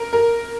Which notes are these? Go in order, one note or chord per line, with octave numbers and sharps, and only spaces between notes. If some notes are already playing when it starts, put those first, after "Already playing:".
Already playing: A#4
A#4